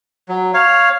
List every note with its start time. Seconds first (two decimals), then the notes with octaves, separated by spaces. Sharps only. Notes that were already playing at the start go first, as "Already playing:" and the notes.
0.29 F#3
0.54 C#5 F5